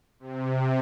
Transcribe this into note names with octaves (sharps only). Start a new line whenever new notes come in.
C3